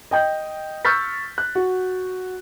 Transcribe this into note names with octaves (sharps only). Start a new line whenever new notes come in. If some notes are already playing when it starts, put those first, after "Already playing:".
D#5 G5 G6
C#6 E6 F6 G6 A6 B6
F#6
F#4